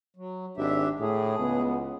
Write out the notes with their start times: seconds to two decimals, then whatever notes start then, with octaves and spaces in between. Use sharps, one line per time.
0.17 F#3
0.57 G#1 D4 G4 E5
1.00 A2 G#4
1.39 C#2 B3